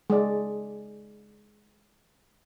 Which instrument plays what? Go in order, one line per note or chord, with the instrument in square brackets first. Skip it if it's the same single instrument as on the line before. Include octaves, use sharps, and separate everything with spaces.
[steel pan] G#3 D5